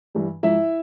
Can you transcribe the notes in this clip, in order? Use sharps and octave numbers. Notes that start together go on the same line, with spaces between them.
G2 E3 G3
G#2 F3 E4 E5